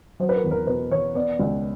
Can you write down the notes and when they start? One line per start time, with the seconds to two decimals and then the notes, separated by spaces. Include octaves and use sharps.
0.20 F#3 C5
0.29 B4
0.35 A#4
0.44 E2
0.51 A#4
0.67 B2 B4
0.91 E2 C#5
1.15 B3 D5
1.39 C#2